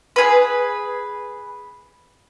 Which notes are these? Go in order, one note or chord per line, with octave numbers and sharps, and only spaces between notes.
G#4 B4